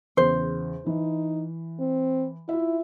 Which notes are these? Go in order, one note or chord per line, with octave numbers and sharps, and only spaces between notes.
E2 C#3 C5
E3 D#4
C4
E4 F4 E5